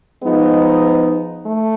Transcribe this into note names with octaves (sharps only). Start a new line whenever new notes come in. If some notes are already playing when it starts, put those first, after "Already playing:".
F3 G#3 B3 D#4
A3